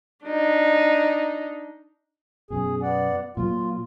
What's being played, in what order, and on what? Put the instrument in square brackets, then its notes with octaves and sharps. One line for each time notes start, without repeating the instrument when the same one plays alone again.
[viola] D4 D#4
[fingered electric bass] F#2 B2 [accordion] G#4
[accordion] B3 D5 F#5
[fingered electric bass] A#2 F#3 A#3 [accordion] F4